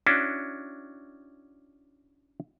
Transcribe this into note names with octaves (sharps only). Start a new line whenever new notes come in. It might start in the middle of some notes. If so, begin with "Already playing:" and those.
C#4 D4 E4 F#4